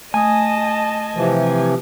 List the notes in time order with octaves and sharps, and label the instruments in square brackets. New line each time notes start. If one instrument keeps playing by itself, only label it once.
[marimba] A3 D#6 [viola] D#5 A5 [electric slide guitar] G#5
[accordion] C3 E3 F3